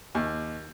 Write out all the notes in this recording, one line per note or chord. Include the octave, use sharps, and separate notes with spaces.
D#2